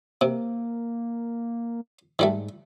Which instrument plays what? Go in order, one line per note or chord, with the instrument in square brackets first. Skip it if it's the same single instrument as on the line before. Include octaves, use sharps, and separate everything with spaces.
[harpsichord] C3 [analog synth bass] A#3
[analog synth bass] G#2 [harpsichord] D#3 G3 A3